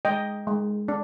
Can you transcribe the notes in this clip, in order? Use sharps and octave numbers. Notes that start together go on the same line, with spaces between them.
G#3 D#5 G5
G#3
D4